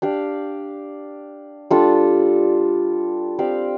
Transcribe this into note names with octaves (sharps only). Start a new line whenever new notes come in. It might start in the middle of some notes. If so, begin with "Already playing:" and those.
D4 G4 D5 F5
G3 D4 F4 A4
C4 G4 D5 F5